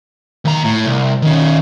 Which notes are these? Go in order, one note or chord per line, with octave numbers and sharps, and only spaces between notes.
D#2 A#5
A2
C2
D#3 C#4